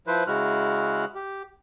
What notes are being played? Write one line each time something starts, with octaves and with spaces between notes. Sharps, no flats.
F3 E4 B4 C5
C#3 G#3 E4 F#4 F6 F#6
G4